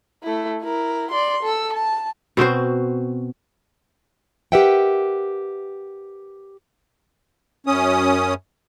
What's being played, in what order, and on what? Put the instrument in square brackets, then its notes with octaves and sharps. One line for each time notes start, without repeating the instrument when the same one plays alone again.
[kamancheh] A3 E4
E4 A#4
D5 C6
A4 E6
A5
[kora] B2 C4 F#4 C5
[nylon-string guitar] G4 A#4 B4 E5 F#5 G5
[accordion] F#2 C#4 D#6